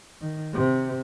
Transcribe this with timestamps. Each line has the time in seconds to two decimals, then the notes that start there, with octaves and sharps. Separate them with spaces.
0.21 D#3
0.53 C3